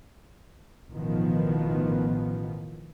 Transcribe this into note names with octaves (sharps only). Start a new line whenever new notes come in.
A1 B2 D#3 F3 B3